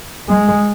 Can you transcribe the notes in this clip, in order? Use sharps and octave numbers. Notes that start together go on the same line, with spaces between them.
G#3